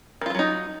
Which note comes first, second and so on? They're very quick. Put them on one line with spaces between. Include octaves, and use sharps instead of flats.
D#3 F4 E3 F#3 D#4